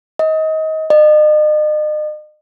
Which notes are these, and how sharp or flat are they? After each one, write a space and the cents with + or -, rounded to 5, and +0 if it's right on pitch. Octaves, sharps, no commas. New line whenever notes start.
D#5 +25
D#5 -40